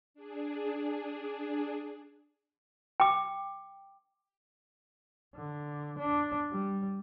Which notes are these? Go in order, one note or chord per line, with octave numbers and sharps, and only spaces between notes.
D4 G#4
G5 D6
D3
D4
G3